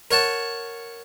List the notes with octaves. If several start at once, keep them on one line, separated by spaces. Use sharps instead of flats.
A#4 C#5 F#5 A5